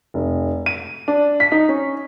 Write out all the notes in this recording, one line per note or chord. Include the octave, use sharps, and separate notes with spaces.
F1
D#7
D4
B6
D#4
C#4